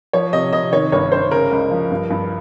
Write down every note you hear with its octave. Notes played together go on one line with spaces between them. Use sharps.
F3 C#5
C3 D#5
C3 D#5
D#3 C#5
G1 C#5
G1 C5
C#3 A#4
C#2
F3
G2
G2